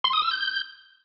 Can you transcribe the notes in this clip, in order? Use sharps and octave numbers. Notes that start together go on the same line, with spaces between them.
C6
D#6
E6
G6